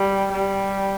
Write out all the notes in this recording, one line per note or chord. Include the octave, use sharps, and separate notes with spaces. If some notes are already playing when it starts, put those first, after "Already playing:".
Already playing: G3
G3